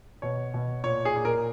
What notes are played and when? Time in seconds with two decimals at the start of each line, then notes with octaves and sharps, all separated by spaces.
0.22 B2 C#5
0.54 B2
0.84 A#2 C#5
1.05 G#4
1.16 A#2
1.25 A#4